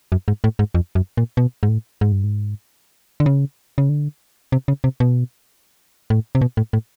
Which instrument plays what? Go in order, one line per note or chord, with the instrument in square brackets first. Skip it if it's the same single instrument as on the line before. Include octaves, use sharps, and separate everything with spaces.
[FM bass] F#2
G#2
A2
G#2
F2
F#2
A#2
B2
G#2
A2
G#2
G2
G#2
D3
C#3
C#3
D3
C3
C#3
C3
B2
A2
C3
B2
A2
A2